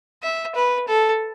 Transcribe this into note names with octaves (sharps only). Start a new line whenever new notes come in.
E5
B4
A4